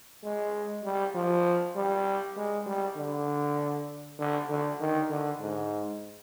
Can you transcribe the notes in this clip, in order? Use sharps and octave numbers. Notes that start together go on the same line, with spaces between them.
G#3
G3
F3
G3
G#3
G3
D3
D3
D3
D#3
D3
G#2